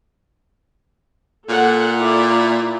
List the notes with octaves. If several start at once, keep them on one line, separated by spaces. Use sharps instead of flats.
A#2 A4 F#5
E4 D5